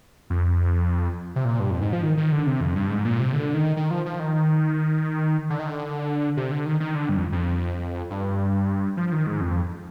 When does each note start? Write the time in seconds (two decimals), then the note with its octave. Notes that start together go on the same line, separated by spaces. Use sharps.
0.30 F2
1.36 C3
1.45 A#2
1.60 G2
1.70 F2
1.81 G#2
1.93 F3
2.03 D#3
2.17 D#3
2.32 D3
2.47 C3
2.61 F2
2.75 G2
2.90 G#2
3.05 A#2
3.19 C3
3.33 D3
3.54 D#3
3.77 D#3
3.91 F3
4.06 F3
4.20 D#3
5.50 D3
5.59 D#3
5.67 D3
6.37 C3
6.51 D3
6.66 D#3
6.80 D#3
6.95 D3
7.09 G2
7.16 F2
7.32 F2
8.11 G2
8.97 F3
9.12 D#3
9.27 G#2
9.41 F2